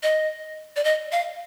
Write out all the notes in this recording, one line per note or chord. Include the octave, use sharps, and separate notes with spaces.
D#5
D5
D#5
F5